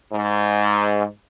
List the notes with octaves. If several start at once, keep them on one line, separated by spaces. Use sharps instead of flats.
G#2